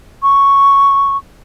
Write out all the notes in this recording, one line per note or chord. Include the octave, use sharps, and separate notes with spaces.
C#6